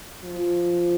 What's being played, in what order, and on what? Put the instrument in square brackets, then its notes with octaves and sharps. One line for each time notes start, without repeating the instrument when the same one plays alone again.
[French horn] F3